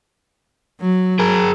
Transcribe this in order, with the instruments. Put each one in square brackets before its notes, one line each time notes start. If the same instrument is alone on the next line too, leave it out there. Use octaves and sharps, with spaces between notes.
[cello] F#3
[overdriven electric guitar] G#4 A#4